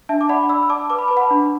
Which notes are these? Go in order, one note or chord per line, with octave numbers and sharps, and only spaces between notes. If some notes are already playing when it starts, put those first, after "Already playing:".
D4 E5 A5
D6
D5 F#5 B5
D5 B5 E6
E6
D5 A5 D6
B4 D6
B5
B4 A5
F#5 B5
D4